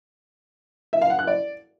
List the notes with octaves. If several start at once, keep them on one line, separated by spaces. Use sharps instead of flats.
E5
F5
F#5
F#6
D5